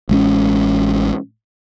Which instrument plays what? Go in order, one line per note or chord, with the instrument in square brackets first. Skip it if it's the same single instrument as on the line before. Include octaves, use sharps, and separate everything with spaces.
[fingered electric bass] A1 G#3 B3 C#4